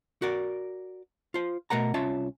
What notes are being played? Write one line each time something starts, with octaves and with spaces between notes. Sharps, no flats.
F#4 A#4 D5
F4 C5
B2 A3 A#4 F#5 A#5
C2 C#4 F4 C#5 E5 A5